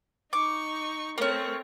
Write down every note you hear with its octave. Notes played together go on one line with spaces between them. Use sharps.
D#4 C#6 D6
A3 A#3 C4 C#4 A#4 C#5